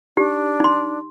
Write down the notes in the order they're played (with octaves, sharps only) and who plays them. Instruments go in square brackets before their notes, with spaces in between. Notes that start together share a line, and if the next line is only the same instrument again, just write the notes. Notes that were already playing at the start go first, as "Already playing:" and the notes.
[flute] D4 [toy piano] D#4 G4
[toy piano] D#4 C6